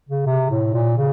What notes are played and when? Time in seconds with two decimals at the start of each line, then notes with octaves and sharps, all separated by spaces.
0.09 C#3
0.26 C3
0.51 A2
0.74 A#2
0.98 C#3